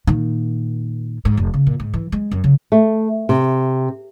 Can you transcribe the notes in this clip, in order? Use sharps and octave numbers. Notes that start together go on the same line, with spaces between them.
A#2 D#3
G#2
F1
C#3
A#2
G#2
E3
G#3
F#2
C#3
A3
C3